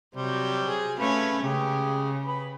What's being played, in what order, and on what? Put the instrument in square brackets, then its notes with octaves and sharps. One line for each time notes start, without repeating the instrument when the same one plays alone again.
[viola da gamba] C3 [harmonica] F#3 G3 C5
[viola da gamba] G#4
[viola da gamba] A3 C#4 C#5 [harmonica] B4 F5
[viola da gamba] C#3 [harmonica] G#3 G4
[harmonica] B4 B5